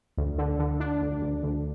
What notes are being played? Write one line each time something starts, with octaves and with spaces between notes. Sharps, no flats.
D2
D3
D3
D4
D2
D2
D2